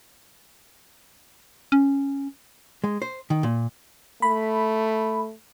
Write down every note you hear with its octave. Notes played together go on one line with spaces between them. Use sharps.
C#4
G#3
C5
D#3
A#2
A3 B5